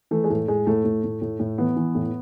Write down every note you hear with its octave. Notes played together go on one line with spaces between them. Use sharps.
E3 A3
G#3
A2 A3
A2 G#3
A2 A3
A2
A2
A2
A2
E3 B3
E3
A2